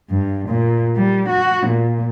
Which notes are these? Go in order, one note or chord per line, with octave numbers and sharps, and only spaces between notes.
G2
A#2
G3
F#4
A#2